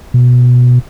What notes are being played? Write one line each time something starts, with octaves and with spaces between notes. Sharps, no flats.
B2